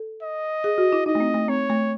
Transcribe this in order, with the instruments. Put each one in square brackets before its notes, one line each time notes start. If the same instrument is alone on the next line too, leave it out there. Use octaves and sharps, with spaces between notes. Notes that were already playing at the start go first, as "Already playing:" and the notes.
Already playing: [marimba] A4
[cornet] D#5
[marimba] G#4
F#4
E4
[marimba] D#4 [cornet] D#5
[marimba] A3
C4
A3
[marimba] C4 [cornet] C#5
[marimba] A3